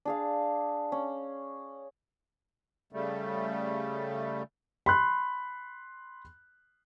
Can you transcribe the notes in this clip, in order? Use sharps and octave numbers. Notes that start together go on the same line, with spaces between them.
D4 G#4 F5
C#4
C#3 G3 A3
B5 C6 F#6